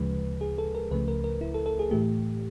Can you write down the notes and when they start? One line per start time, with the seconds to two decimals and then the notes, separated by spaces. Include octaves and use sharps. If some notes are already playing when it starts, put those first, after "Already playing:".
Already playing: D2 C#3 F3 G#3 B4
0.41 G#4
0.58 A4
0.75 A#4
0.91 C#2 C#3 F3 A3 B4
1.08 A#4
1.24 A#4
1.41 E4
1.54 A4
1.66 A4
1.79 G#4
1.91 A2 E3 A3 G4